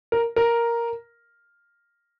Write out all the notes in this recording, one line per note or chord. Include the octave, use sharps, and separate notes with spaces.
A#4
A#4